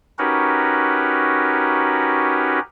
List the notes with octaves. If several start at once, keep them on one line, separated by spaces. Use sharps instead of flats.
C#4 D#4 F#4 G4 A#4 B4